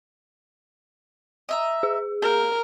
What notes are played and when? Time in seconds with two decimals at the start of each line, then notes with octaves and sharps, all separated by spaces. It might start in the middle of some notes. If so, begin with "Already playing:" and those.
1.49 D#5 E5 A#5
1.83 G#4
2.22 A#3 A#4 G6